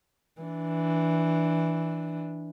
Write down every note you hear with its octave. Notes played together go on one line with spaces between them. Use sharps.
E3 D4